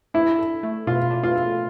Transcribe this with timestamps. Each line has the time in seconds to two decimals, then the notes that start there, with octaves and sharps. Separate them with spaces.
0.14 D4 E4
0.39 A4
0.63 A3
0.87 B2 F4
1.11 D4
1.23 F4
1.36 A4